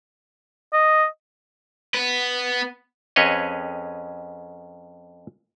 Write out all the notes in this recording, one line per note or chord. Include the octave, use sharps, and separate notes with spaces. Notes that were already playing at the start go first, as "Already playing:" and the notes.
D#5
B3 B4
F2 C#4 G#4 B4 C#5 D#5